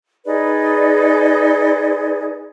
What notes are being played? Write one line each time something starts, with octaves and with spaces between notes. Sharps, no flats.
D#4 G#4 B4 D5